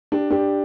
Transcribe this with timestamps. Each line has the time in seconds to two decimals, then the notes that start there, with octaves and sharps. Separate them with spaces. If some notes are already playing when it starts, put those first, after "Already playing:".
0.12 D4 G4
0.31 D4 G4